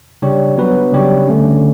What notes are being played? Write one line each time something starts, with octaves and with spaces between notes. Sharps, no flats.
C#3 G3 D4 G4 C#5
F#3 B3 F#4 B4
C#3 G3 D4 G4 C#5
D3 A3 C#4